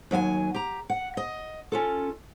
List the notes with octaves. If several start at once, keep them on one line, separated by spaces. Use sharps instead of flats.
D#2 F#3 E5 G#5
G4 A#5
F#5
D#5
C#4 F4 A4